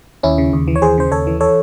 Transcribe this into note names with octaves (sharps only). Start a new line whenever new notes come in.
D#2 C#4 E4
C#3
D#2
E3
C#5
D#2 G#4 C5
C#3 C5
D#2 A4 C#5
E3
A4 C#5